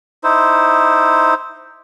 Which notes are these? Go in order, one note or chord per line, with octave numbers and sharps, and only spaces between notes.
D#4 E4 C5